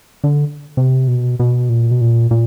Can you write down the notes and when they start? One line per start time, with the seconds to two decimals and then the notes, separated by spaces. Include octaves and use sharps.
0.24 D3
0.77 C3
1.08 B2
1.40 B2
1.69 A#2
1.91 B2
2.01 A#2
2.31 A#2